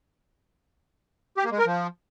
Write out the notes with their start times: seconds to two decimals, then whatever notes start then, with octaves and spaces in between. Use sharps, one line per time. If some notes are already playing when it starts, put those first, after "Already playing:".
1.37 G4
1.44 A#3
1.52 G#3
1.59 A#4
1.66 F3